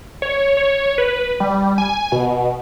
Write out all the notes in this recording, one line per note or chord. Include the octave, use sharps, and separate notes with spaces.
C#5
C#5
B4
G3
G#5
B2